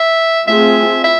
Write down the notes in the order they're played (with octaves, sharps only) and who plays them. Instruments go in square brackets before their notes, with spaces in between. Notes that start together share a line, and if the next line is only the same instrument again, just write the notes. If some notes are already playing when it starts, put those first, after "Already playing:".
Already playing: [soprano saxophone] E5
[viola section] A3 C4 F4 G#4 [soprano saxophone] E5
[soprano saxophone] E5